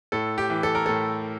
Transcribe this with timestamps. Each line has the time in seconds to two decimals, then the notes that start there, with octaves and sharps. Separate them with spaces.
0.12 A2 A4
0.38 G4
0.50 E3
0.63 A4
0.75 A#4
0.86 A2 A4